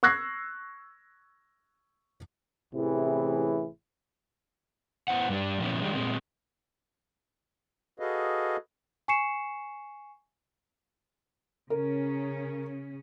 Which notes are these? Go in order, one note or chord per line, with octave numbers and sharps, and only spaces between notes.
C#6 E6 F#6 G#6 A#6 C7
A1 A2 C3 E3 E4 G#4
B3 E4 C5 F#5
G2 G3 D4
A#2 F3 A#3 B3 C#4 E4
D#3 G3 G#3 D4
A#2 G#3 C4
F#4 G#4 A4 B4 D#5 F5
G#5 C#6 C7 C#7 E7
C#3 C#4 A#4